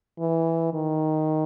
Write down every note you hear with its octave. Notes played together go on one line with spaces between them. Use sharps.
E3
D#3